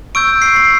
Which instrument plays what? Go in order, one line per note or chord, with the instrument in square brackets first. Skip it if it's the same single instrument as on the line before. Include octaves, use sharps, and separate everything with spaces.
[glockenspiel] C#6 E6 G6 D7
C7
C7